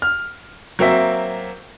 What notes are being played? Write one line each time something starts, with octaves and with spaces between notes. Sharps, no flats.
F6
F#3 A#3 C4 E5